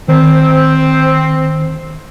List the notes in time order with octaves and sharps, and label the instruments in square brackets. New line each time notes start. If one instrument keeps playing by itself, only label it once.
[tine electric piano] D#3 [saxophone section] C4